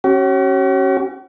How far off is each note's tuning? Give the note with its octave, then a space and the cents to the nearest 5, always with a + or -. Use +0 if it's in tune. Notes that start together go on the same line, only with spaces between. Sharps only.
C#4 -20 F#4 +45